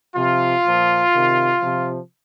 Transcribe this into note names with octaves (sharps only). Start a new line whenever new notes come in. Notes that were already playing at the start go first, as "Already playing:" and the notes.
C3 F3 F4
A#2 F3
C3 D#3
C3 F3